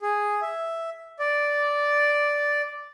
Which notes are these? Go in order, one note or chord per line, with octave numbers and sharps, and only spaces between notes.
G#4
E5
D5